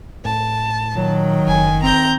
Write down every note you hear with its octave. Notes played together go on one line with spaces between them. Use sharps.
A2 A5
A#2 D#3 F#3
F#1 G#5
C4 A#5 G6